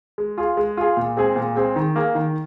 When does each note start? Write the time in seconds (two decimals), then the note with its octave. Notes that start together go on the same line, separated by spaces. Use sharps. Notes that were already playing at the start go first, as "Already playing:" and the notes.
0.18 G#3
0.38 F4 G#4
0.57 G#3
0.77 F4 G#4
0.97 A#2
1.17 G#3 C4 G#4
1.36 A#2
1.55 G#3 C4 G#4
1.76 D#3
1.96 A#3 G#4
2.15 D#3